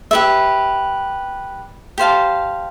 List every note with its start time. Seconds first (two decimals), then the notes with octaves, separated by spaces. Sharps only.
0.11 G4 B4 E5
1.98 G4 C5 F5 A5